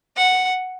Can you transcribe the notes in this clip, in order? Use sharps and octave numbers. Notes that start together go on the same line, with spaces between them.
F#5